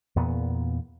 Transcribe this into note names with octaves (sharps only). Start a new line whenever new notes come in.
E2 A#2 B3